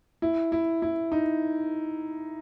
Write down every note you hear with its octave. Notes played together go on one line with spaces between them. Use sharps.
E4
E4
E4
D#4